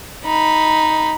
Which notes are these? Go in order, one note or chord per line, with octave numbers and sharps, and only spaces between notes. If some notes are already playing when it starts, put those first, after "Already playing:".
D#4 B5